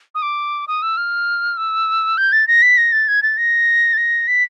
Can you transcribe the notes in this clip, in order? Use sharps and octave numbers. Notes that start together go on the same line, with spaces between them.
D#6
D6
D#6
E6
F6
E6
G6
A6
A#6
B6
A#6
A6
G#6
A6
A#6
A6
A#6
B6